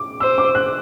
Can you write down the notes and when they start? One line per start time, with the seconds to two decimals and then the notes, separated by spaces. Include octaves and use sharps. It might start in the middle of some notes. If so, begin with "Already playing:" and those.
Already playing: D6
0.20 C5 E6
0.38 D6
0.55 F#6